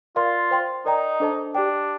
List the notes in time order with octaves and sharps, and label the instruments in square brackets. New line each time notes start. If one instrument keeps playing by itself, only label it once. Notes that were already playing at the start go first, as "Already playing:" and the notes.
[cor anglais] F4 [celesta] A#4 D5 F5 C6
[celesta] C5 G5 C6
[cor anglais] D#4 [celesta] A#4 D5 G5 A#5
[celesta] D4 A4 C5 D#5 A5
[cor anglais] D4 [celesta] G4 D5 G5